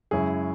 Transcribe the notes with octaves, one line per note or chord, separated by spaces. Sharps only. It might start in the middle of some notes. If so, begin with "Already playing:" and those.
F#2 C#3 G#3 C#4 E4 G#4